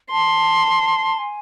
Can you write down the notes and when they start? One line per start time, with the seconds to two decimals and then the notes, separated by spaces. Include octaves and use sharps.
0.11 A5 C6
1.18 G#5